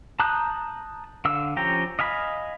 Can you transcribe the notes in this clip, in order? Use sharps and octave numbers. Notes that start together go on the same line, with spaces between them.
A5 A#5 D#6 F#6 G6
D3 F5 E6
F3 C#4 G4 G5 A#5
D#5 F5 G#5 B5